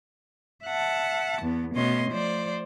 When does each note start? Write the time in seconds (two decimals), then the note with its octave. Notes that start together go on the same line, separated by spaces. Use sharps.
0.66 E5 F#5 A5
1.42 E2 B3
1.75 B2 A3 C#4 D#5 C6
2.10 F3 A3 C5 D5